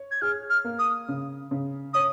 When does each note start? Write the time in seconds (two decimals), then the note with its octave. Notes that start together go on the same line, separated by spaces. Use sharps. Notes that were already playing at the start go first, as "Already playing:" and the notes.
Already playing: C#5
0.11 G#6
0.22 G#4 F6
0.50 F6
0.64 A#3
0.79 D#6
1.08 C#3
1.51 C#3
1.94 C#5 D#6